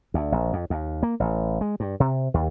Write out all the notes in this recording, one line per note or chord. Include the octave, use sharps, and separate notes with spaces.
D2
A#1
F2
D#2
A#3
A1
G#3
G2
C3
D#2